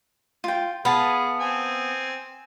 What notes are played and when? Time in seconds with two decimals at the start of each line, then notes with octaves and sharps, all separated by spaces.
0.44 F4 G5
0.85 B3 G#4 F5 A5 B5
1.40 C4 G#5